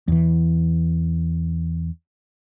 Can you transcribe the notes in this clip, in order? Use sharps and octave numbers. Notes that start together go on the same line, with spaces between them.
E2 E3